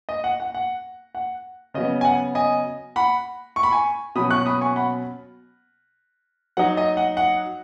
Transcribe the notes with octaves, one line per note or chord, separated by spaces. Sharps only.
D#5
F#5
F#5
F#5
F#5
C#3 F#3 B3 D#5
G#5
F#5
D#5 G#5
F#5 B5
C#6
B5
G#5 C#6
B2 F#3 C#4 B5 D#6
C#6 F#6
B5 D#6
G#5 C#6
F#5 B5
F#3 D#4 F#5
D#5
F#5
F#5